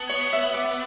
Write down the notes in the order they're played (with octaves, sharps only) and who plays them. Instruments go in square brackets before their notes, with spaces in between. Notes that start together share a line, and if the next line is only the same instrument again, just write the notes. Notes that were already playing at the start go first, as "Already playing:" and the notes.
Already playing: [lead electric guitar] B3 [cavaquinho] A5
[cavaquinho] C#5
E5
D6